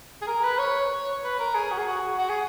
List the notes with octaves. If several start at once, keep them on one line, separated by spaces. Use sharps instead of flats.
G#4
A#4
B4
C#5
B4
A#4
G#4
F#4
G#4
F#4
F#4
G#4